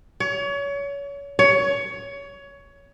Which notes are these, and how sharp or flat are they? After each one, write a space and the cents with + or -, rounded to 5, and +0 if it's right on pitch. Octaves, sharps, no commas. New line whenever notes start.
C#5 +30
C#5 +20